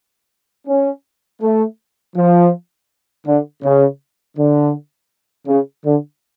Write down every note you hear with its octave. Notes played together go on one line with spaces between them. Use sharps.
C#4
A3
F3
D3
C#3
D3
C#3
D3